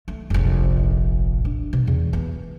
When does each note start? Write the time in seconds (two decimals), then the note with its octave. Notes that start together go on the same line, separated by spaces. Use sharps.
0.08 A3
0.30 F1 A#1
1.45 D4
1.73 B2
1.87 E2
2.13 B3